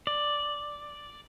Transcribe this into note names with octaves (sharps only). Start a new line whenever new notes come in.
D5